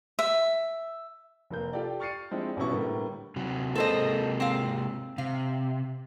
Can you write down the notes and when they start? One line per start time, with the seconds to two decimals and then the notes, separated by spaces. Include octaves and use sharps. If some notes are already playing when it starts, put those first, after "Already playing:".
0.19 E5
1.50 F1 A#3 G6
1.73 F4 G4 A4 D5
2.00 C#6 F6 A6 C7 C#7 D#7
2.31 F3 G#3 C4 D4 E4 G4
2.57 A1 B2 F#3 C#4 E4 C#6
2.71 A2 D3 G3 A#3 B3
3.36 C3 F#3
3.75 C3 G#3 A#3 A4 C5 D#5
4.40 C4 F5
5.18 C3 F5